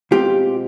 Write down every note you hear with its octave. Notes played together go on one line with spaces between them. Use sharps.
B2 G#3 C4 F4 G4